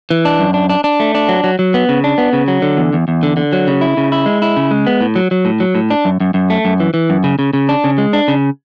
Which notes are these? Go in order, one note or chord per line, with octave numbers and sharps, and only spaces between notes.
E3
D4
F#2
D4
D4
D4
A3
D4
F#3
F#3
F#3
B3
C#3
D4
B3
C#3
F#3
D3
E2
E2
E2
D3
D3
F#3
C#3
E4
C#3
E4
G#3
E4
C#3
G#3
B3
A2
F#3
F#3
A2
F#3
A2
D4
F#2
F#2
F#2
A3
F#2
E3
E3
F#2
C#3
C#3
C#3
D4
C#3
G#3
D4
C#3